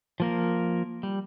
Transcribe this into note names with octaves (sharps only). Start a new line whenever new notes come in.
F3 A#3 A#4
G3